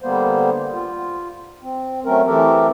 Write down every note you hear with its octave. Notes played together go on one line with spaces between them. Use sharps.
D3 G3 A#3 B3 C5
F4
C4
F#3 A3 C4 C#4 A#4
E3 A3 C4 G4 A4 A#4